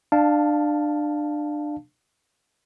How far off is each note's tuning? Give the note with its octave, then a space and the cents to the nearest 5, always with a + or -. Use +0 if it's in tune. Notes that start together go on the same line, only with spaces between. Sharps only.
D4 +25 F5 +0 A5 +0